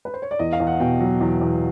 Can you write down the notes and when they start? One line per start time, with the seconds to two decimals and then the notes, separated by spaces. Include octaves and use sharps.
0.05 B4
0.14 C5
0.22 C#5
0.31 D5
0.39 E2 D#5
0.53 F5
0.60 E2
0.67 F#5
0.80 B2 G5
1.01 F#3
1.21 E2
1.41 E2